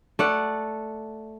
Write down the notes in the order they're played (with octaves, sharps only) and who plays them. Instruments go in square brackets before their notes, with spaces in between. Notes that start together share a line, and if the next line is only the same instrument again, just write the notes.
[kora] A3 D5 F#5